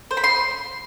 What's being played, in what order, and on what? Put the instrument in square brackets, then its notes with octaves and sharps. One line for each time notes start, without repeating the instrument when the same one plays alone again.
[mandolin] C5
B5
C6